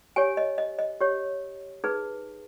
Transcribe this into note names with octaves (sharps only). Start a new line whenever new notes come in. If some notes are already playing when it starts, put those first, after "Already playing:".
G4 C#5 G#5
D#5
D#5
D#5
G4 C#5
D#4 G#4 B4